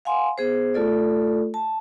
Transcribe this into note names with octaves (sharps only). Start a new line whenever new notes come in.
F5 F#5 G#5 C6
B3 G#4 C5
A3 F4 A4 D5
A5